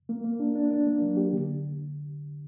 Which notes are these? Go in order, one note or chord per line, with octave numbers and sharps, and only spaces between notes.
A#3
A#3
D4
D4
D4
A#3
F#3
G4
D3